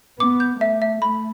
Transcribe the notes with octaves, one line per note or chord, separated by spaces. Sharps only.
B3 D6
G6
A3 E5
E5
A3 B5